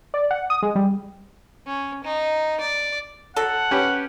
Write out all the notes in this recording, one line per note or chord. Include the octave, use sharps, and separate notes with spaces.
D5
F#5
D#6
G#3
G3
C#4
D#4
D5
F#3 A4 F#5
C#4 G4 B4